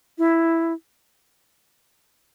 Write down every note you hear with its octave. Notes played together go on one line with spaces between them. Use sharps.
E4